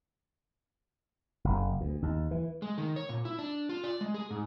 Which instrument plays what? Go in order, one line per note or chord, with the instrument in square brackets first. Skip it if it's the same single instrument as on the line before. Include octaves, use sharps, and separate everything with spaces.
[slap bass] F#1
D2
D#2
E3
[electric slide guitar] G#3
D#3
C#5
A#2
E4
D4
F4
D5
G#3
G#4
G#2